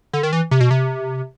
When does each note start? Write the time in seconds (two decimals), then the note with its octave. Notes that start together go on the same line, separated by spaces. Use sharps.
0.13 D3
0.23 D#3
0.33 E3
0.51 C3
0.60 B2
0.71 C3